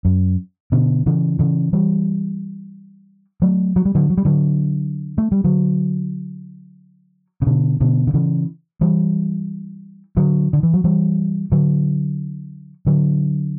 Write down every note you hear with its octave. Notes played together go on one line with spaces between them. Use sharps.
F#2
B2 D3
C#3 E3
C#3 E3
E3 G3
F#3 A3
F#3
G3
D3 F#3
F#3
G3
D3 F#3
A3
G3
D3 F#3
C#3
B2 D3
B2 D3
D3
C#3 E3
E3 G3
D3 F#3
D3
E3
F#3
E3 G3
D3 F#3
D3 F#3